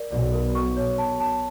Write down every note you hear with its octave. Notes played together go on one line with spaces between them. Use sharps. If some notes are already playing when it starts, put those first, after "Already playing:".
Already playing: A#4 D5
B1 B2 D5
A#4
C#6
C#5
A5
A5